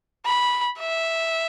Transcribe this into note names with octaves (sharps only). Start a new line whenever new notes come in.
B5
E5